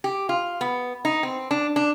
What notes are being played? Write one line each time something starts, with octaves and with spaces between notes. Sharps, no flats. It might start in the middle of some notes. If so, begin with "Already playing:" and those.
G4
F4
B3
D#4
C4
D4
D4